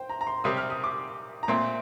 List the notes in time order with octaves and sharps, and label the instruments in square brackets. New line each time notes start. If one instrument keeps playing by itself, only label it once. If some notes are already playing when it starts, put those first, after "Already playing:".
Already playing: [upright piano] C5 G5
A#5
A#5
C6
[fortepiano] C3 G3 C4 G4 [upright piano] D#6
[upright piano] F6
D#6
D6
A#5
[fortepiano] A#2 A3 C4 [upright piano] C6